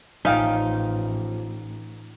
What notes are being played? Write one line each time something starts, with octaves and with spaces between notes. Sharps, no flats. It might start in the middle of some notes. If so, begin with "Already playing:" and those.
A1 F3 C#4 D#4 F5 G5